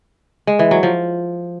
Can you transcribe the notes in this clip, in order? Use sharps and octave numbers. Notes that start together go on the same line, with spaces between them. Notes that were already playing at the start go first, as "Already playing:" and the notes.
G#3
E3
F#3
F3